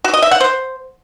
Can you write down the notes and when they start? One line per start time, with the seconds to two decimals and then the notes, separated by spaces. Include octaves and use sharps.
0.04 F#4
0.13 D#5
0.22 E5
0.31 F#5
0.40 C5